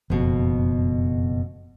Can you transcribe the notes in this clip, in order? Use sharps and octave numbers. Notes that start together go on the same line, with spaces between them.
F#1 F2 B2